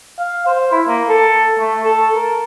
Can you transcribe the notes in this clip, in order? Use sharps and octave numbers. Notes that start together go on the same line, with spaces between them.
F5
C5
E4
A#3
A4
A3
A4
A#4